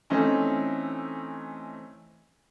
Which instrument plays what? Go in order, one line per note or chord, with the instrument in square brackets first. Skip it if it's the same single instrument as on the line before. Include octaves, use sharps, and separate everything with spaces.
[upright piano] E3 A3 C4 C#4 D#4